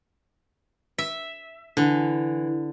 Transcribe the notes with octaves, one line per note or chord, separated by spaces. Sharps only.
E5
D3 E3